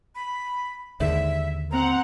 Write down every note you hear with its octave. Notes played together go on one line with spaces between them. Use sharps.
B5
D#2 G#2 D3 E5
C4 F#5 A#5